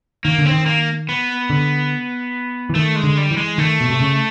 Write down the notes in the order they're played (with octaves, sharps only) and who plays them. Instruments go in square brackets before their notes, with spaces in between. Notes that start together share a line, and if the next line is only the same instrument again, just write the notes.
[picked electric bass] D#3 [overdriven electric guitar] A#3
[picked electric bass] D3
[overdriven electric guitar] C4
[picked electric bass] D#3
[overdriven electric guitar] A#3
B3
[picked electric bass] D3
E3
[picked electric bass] D#3 [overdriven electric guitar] A3
[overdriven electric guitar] G#3
[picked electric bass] D3
[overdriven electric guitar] G3
[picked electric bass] E3
[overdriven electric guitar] G#3
[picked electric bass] D#3 [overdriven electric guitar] A3
[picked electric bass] B2
C3
C#3